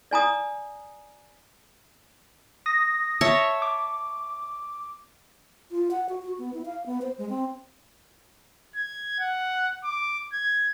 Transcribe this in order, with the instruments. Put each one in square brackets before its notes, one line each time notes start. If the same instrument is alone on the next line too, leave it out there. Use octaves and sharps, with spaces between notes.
[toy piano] D5 G#5 A#5 D#6
[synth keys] D#6 A#6
[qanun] C#5 E5 A5
[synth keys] D6
[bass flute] F4
F#5
F#4
F#4
B3
E4
F5
B3
C5
G#3
C4
[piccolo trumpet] G#6
F#5
D6
G#6